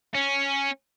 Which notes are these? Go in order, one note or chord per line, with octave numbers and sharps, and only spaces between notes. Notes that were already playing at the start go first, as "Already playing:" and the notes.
C#4